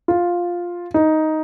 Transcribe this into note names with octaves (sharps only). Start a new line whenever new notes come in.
F4
D#4